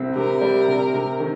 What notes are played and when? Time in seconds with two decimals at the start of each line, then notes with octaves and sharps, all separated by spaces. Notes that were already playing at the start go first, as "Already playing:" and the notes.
Already playing: C2 C4
0.16 C3 A#4
0.41 G3
0.68 C3
0.94 C3
1.20 D#3